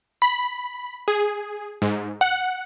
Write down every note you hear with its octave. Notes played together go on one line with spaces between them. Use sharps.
B5
G#4
G#2
F#5